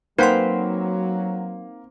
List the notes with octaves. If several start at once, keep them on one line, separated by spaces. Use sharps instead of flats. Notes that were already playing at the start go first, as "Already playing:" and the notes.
F#3 A#3 C4 D#4 B4 C5 F#5 C6